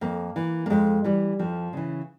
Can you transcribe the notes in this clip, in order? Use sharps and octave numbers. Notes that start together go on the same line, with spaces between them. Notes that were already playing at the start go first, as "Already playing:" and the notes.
F2 A#3
E3
A#3
F2 G#3
E3 G3
F2 F3
C#3 E3